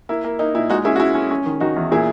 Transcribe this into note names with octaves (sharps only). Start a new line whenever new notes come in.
A#3 E4
A#3
A#3 D#4
A#2 E4
G#3 D#4 F#4
C#4 E4 G#4
F#4
C#4 E4
C#4
C#4
D#3
D#3 D#4 F#4
E2
A#2 E4 G#4